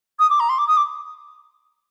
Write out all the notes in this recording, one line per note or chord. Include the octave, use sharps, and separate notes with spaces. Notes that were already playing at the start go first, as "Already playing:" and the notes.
D#6
D6
A#5
C6
D6
D#6
D6